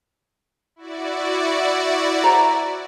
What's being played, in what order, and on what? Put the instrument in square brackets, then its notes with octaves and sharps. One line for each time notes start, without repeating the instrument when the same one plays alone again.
[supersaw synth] E4 F#4 D5
[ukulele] C5 A#5